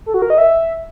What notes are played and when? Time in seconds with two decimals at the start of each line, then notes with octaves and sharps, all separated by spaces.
0.06 A4
0.14 F#4
0.22 A#4
0.30 D#5
0.38 E5